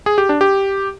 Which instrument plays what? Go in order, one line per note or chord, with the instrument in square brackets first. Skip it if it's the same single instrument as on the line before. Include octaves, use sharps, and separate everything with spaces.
[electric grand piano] G#4
G4
D4
G4